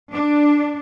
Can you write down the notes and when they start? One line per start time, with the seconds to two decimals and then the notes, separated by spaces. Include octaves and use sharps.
0.11 D4